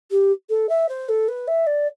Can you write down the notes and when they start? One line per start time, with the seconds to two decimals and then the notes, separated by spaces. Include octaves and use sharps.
0.11 G4
0.49 A4
0.69 E5
0.88 C5
1.08 A4
1.28 B4
1.47 E5
1.66 D5